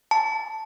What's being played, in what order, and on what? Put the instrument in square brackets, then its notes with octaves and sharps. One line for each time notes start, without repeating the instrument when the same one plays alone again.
[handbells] A5